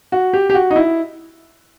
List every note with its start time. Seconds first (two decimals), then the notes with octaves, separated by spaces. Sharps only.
0.12 F#4
0.33 G4
0.50 G4
0.54 F#4
0.71 D#4
0.76 E4